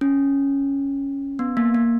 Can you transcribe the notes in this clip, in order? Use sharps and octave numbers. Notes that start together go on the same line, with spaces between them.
C#4
B3
A#3
A#3